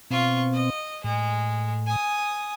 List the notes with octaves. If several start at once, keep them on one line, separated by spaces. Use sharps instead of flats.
B2 C4 F4 C#6
D#5
A2 G#3
G#5 D#6